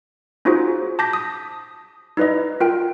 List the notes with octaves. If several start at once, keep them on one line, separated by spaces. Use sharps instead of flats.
C#4 D#4 F4 F#4 G#4 C5
A5 D6 G6 A#6 B6
D#6
D#4 E4 B4 D5 D#5
F4 A#4 G5